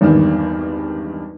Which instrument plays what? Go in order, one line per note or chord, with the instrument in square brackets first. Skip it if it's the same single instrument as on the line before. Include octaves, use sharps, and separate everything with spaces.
[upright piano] G#1 E2 G2 D#3